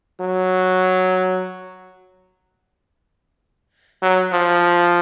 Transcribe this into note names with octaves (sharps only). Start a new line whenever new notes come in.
F#3
F#3
F3